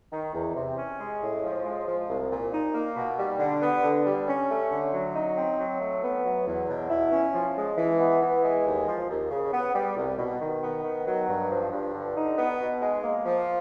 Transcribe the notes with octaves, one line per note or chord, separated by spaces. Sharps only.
D#3
E2
C3
C#4
G#3
A2
F3
G#3
F3
C2
A#2
D#4
A#3
B2
G3
D3
B3
D3
G3
C#4
A3
D3
F#3
D#4
C4
F#3
A3
B3
F#3
E2
B2
E4
C#4
F3
G#3
E3
B3
E3
G#3
D#2
F3
D#2
C#3
B3
G3
C2
B2
D#3
B3
D#3
F#3
G2
F3
G2
D3
D#4
B3
B2
G#3
A#3
F3